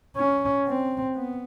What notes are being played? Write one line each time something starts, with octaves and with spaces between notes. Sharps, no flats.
C#4
C4
B3